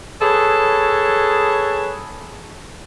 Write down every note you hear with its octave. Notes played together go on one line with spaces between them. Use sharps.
G#4 A4 B4 C#5